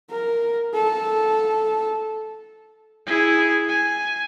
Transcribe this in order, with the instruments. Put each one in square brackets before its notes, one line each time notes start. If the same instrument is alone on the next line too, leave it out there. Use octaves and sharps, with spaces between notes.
[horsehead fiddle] A#4
A4
[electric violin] E4 G#4
G#5